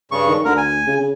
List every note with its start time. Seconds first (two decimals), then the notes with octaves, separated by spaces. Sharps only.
0.12 G2 C#3 C#6
0.28 D#3
0.45 D2 D3 A#4
0.57 G#5
0.87 C#3
1.00 C#3